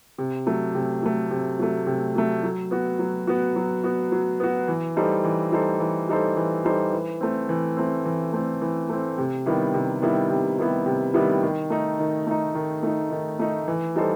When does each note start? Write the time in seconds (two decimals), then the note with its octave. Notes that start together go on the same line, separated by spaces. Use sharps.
0.18 C3
0.46 F#3 A3
0.75 C3
1.02 F#3 A3
1.31 C3
1.59 F#3 A3
1.87 C3
2.15 F#3 A3
2.43 F#3
2.71 B3 F#4
2.99 F#3
3.27 B3 F#4
3.56 F#3
3.84 B3 F#4
4.12 F#3
4.40 B3 F#4
4.68 E3
4.96 G3 D#4 A4 C5
5.24 E3
5.52 G3 D#4 A4 C5
5.80 E3
6.09 G3 D#4 A4 C5
6.37 E3
6.65 G3 D#4 A4 C5
6.93 E3
7.21 A3 C4
7.49 E3
7.77 A3 C4
8.06 E3
8.33 A3 C4
8.62 E3
8.89 A3 C4
9.18 C3
9.46 D#3 G3 B3 E4
9.74 C3
10.02 D#3 G3 B3 E4
10.30 C3
10.58 D#3 G3 B3 E4
10.86 C3
11.14 D#3 G3 B3 E4
11.43 D#3
11.70 A3 D#4
11.99 D#3
12.27 A3 D#4
12.55 D#3
12.83 A3 D#4
13.11 D#3
13.39 A3 D#4
13.68 E3
13.96 G3 D#4 A4 C5